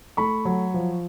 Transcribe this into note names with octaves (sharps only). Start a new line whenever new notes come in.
A3 B5 C#6
F#3
F3